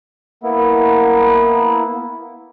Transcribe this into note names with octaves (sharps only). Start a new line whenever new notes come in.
A#3 B3 E4